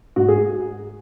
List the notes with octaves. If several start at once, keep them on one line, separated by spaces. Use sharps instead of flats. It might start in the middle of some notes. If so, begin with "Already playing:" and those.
G#2 F#4
G#4